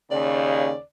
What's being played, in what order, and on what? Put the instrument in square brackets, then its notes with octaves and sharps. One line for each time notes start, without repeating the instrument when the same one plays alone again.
[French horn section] D#2 C#3 [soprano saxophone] D5